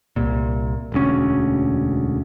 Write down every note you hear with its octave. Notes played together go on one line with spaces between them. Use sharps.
C2 A#2
E1 D2 C#4